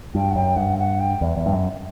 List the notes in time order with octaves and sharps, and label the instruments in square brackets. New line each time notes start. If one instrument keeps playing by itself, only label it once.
[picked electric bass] G2 [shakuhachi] G5
[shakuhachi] F#5
[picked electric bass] F#2 [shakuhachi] G5
[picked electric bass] G2 [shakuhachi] F#5
[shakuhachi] F#5
G5
[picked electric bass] E2
E2
G2
F#2